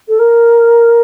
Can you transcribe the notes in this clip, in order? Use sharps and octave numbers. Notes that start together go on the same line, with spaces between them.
A4
A#4